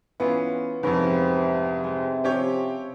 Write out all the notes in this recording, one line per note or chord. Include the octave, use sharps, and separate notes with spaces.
E3 B3 C#4 F4 F#4
F2 G#2 C3 B3 C#4 A#4
G#3
F3 C4 C#4 G4 C#5